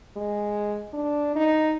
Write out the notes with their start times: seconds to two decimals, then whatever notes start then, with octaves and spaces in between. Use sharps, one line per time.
0.16 G#3
0.93 D4
1.35 D#4